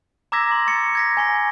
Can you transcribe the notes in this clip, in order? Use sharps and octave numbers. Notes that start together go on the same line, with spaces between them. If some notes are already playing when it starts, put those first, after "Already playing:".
A#5 D6 E6 G#6 A#6 B6
C6
C#6 A6 C#7
G#6 A#6 B6
G#5 C#6 B6